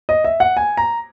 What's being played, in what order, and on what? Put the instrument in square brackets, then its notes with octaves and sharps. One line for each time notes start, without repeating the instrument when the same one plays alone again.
[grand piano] D#5
E5
F#5
G#5
A#5